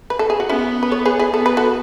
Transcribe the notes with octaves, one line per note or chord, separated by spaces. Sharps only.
B4
A4
G#4
F#4
B3 C#4 E4
B4
A4 C#5
G#4 B4
E4 G#4
B3 A4
B4
F#4 A4